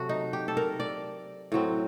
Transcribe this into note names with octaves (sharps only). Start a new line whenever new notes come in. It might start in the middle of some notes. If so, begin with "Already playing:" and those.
Already playing: C3 F#3 A3 F#4
D#4
G4
A4
A#4
D5
A2 F#3 C4